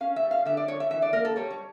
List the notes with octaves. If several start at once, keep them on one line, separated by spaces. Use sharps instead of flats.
C#4 F5
E5
G3
F5
D3 E5
D5
D3 C#5
E5
E3 E5
D5
A#3 A#4
A4
G3 C#5
C#5